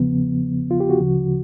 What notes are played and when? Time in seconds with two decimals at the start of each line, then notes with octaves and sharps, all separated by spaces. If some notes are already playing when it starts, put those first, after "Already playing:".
Already playing: E2 C#3 F3 B3
0.71 F4
0.80 G4
0.90 F#4
0.99 D2 C#3 F3